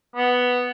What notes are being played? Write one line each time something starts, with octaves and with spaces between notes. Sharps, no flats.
B3